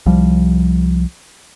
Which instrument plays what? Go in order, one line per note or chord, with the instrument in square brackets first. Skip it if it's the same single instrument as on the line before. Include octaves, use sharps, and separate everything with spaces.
[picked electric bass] C2 F3 G3